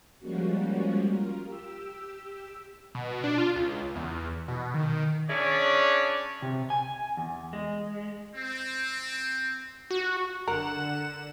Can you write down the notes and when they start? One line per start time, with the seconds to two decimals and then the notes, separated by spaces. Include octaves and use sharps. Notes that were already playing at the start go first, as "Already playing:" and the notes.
0.20 F3 G3 G#3 A#3 C#4 F#4
1.03 F4 A#4
1.44 G4 E6
2.95 B2
3.24 D4
3.38 F4
3.56 C#2
3.95 E2
4.48 B2
4.74 D#3
5.29 C#4 D4 E4 G#4 C#5 D5
6.42 C3
6.70 G#5
7.17 E2
7.53 G#3
8.35 C4
9.91 F#4
10.48 F#1 D3 A#4 F#5 E7